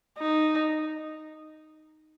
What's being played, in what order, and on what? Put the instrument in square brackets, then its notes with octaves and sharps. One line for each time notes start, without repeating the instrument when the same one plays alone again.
[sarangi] D#4